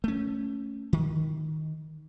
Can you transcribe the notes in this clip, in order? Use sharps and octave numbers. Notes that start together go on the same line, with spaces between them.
A3 C#4
D#3